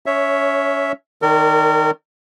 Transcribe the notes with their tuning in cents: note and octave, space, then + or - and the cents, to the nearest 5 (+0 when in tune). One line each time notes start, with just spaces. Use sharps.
C#4 +25 C#5 +0 E5 +0
D#3 +0 A#4 -35 D5 -30